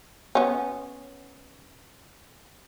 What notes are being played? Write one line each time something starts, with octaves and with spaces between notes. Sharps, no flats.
B3 C#4